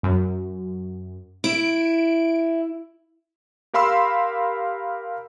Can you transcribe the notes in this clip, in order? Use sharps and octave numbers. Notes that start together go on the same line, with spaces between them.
F#2
E4 D7
G4 A#4 F5 B5 C6 E6